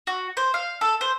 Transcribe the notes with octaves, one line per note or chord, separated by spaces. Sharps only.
F#4
C5
F5
A4
C5